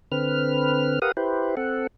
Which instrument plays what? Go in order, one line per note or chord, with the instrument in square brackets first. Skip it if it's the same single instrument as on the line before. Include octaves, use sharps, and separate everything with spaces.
[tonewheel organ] D3 C4 B4 F6
G4 A#4 B4 F5 F#5 D#6
E4 G4 B4 C5
C4 A4 F#5